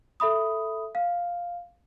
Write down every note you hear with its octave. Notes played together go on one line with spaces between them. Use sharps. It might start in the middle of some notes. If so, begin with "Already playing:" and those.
A4 E5 B5 D#6
F5